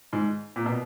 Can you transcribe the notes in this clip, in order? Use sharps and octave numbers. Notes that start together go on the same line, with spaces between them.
G#2
A#2
B2